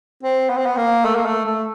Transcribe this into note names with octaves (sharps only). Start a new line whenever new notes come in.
C4
B3
C4
B3
A#3
A3
A#3
A3
A3